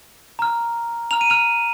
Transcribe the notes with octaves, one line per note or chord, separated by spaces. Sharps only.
A#5 F6
A#5 F6 F7
D#7
F6 F7